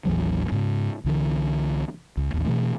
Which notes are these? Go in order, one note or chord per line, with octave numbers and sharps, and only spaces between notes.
A1 D#2 E3 F#3
G#2 C#3
C2 D3 E3
C#2
A1 D#2
B2 E3 A3